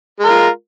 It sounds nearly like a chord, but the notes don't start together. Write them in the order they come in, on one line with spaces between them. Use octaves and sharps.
G#3 A#4 F4